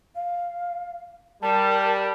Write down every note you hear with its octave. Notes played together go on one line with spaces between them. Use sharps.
F5
G3 A#4 A5